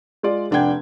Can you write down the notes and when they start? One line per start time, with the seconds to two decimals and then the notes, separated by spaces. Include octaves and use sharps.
0.23 G#3 F4 D5
0.51 F1 D4 F#5 G5 G#6